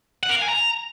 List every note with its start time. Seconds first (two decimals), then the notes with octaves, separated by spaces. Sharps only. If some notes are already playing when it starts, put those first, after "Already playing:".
0.23 F#5
0.29 A#4
0.36 F5
0.42 G#5
0.48 A#5